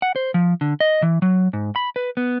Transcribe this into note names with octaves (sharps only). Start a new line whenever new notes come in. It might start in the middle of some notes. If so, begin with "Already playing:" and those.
F#5
C5
F3
D3
D#5
E3
F#3
G#2
B5
B4
B3